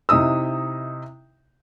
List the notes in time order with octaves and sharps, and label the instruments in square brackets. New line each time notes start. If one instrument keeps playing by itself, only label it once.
[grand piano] C3 D#4 E4 D#6 E6